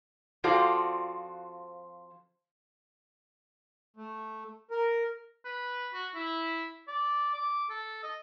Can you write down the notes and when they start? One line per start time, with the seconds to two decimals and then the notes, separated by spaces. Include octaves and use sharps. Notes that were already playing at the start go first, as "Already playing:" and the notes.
0.44 F3 C4 F4 F#4 A4 D5
3.97 A3
4.71 A#4
5.45 B4
5.93 F#4
6.15 E4
6.88 D5
7.34 D6
7.70 A4
8.03 D#5